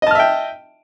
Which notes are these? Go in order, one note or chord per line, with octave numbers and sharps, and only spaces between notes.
D#5 E5 G5 A5 F6